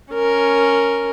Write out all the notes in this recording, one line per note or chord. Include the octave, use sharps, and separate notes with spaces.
C#4 A#4